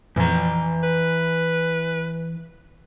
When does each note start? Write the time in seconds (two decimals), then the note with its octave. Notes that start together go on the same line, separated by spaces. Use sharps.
0.16 F2 A#2 E3 F3 A#5
0.83 B4